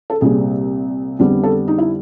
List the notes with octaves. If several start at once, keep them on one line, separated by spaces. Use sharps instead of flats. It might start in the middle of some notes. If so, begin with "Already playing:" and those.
A4
C2 A#2 G3 C4 G#4
F2 D3 G3 B3
A4
D#4
E4